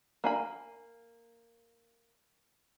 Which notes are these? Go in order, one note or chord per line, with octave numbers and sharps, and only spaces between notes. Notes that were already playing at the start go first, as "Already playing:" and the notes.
A#3 G#5 B5